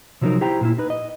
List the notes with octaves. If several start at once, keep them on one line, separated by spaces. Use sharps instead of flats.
C3 F3 F#3 B3 D#4 A#4
E4 G4 C5 G5 A#5
A#2 A#3 E4
D#4 B4
D#5